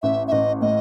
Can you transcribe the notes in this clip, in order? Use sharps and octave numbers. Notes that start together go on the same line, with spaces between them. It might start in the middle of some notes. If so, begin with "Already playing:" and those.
A1 E5
E5
A1 D#5
A2 D#5